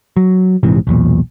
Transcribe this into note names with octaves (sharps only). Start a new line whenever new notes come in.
F#3
A#1 G#2 C3 E3
B1 E2 A#2